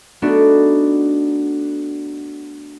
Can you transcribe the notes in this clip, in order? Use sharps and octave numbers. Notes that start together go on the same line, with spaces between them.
A3 B3 D4 D#4 F#4